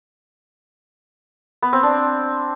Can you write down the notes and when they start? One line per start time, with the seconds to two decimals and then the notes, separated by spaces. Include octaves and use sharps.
1.62 B3
1.73 C4
1.83 D4